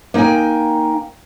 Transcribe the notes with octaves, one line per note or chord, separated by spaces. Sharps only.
A#3 D#4 F5 G5 G#5